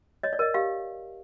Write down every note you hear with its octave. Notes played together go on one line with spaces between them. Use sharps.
C#5 D#5
D5
A#4 D#5
G4 F5